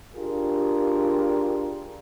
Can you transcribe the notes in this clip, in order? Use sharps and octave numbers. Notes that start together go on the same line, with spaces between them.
D4 F4 G4 G#4 A#4